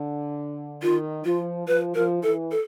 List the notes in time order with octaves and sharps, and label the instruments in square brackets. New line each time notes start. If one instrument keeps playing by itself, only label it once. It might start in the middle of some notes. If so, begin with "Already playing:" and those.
Already playing: [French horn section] D3
[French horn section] D#3 [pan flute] F4
[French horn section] F3 [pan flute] F4
[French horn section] F3 [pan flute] B4
[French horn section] F3 [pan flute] A#4
[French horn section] E3 [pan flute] A4
[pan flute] A4